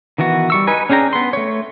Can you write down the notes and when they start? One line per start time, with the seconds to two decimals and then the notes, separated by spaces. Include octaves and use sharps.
0.18 D#3 E3 B3 F#4
0.50 G3 C#6 E6
0.67 D#4 B4 G#5
0.89 C#4 D4 G#4 G5 A#5
1.13 B3 C6
1.33 A3 C#5